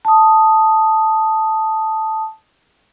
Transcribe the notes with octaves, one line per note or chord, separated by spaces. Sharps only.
A5 D#6